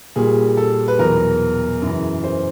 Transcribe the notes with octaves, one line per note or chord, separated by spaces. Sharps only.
A#2 G3 G#4
A4
B4
E2 B2 F#3 A#4
F#2 C#3 E3
C5